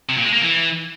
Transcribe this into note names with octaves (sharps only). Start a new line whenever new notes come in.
C3
A#2
G#3
A#3
E3